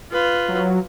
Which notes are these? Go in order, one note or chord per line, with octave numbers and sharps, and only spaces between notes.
F4 B4
F#3